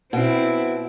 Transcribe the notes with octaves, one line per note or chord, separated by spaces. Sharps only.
B2 C4 E4